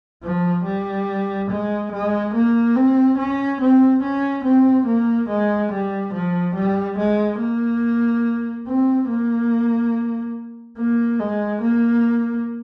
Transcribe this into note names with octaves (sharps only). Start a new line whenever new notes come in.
F3
G3
G#3
G#3
A#3
C4
C#4
C4
C#4
C4
A#3
G#3
G3
F3
G3
G#3
A#3
C4
A#3
A#3
G#3
A#3